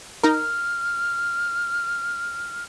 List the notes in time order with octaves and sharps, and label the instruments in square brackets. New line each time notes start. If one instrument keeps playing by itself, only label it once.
[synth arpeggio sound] D#4 A#4 [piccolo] F6